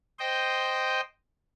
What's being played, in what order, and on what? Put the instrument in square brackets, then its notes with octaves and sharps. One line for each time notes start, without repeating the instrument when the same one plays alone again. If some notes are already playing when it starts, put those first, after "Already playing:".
[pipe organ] C5 D#5 G5